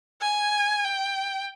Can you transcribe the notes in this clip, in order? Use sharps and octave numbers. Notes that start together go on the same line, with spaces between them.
G#5
G5